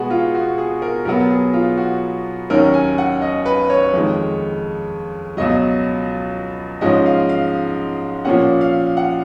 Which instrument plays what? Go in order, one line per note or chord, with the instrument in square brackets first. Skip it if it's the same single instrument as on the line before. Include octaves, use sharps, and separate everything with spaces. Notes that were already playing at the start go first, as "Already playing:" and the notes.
Already playing: [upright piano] B2 G#3 B3 F#4 G#4
F4
F#4
G#4
A#4
B2 F#3 B3 A#4
G#4
F4
F#4
D#2 D#3 F#3 C#4 A#4
G#5
F#5
D#5
B4
C#5
F2 D#3 G#3
C#2 B2 F#3 D#5
G#2 F3 G#3 C#4 D#5
F5
F5
A#2 F3 A#3 C#4 F#5
F5
F#5